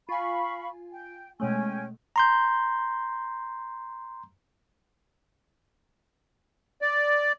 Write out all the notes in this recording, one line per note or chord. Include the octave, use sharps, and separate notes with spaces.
F4 F5 G#5 B5 C#6
G5
B2 G#3 A3 C#4 G5 G#5
A#5 C6 G6
D5